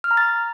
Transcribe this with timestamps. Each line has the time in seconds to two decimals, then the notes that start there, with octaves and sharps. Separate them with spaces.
0.04 F6
0.11 A#5
0.17 A6